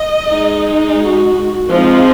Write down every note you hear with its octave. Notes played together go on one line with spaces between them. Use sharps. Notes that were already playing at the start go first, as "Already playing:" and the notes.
Already playing: D#5
G#3 D#4
F#4
F3 G#3 C4 D#4 F4